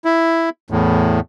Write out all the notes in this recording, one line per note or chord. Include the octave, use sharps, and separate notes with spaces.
E4
E2 A2